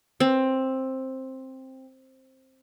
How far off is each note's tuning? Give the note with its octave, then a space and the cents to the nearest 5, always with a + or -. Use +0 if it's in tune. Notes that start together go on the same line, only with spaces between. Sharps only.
C4 +10